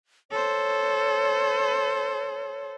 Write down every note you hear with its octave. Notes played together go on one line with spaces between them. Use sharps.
A4 C5 C#5